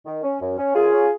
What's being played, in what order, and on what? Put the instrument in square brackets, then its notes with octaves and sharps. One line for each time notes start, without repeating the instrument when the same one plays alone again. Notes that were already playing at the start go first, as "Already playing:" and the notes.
[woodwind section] D#3
C#4
F#2
C#4
F#2 F4 G#4
C#4